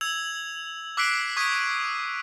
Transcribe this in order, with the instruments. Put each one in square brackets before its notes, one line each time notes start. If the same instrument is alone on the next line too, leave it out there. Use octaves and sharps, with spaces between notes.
[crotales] E6 G#6 F7 F#7
D6 E6 F#6 B6 C7 D7
C#6 D#6 G#6 B6 D#7